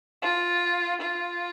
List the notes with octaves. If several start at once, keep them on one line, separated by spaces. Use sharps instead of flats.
F4
F4